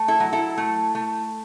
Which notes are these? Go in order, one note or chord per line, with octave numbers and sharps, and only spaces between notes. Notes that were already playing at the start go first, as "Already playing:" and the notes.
Already playing: A3
E4 A4
F#3
E4 A4
A3
A3